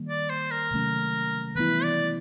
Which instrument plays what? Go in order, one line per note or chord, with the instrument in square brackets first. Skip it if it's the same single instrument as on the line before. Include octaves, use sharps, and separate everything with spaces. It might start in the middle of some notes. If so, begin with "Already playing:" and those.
Already playing: [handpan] D#3 G3 A#3
[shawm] D5
C5
A#4
[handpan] C3 D#3 F#3 A3 C#4
[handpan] E3 G3 B3 E4 [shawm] B4
[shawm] D5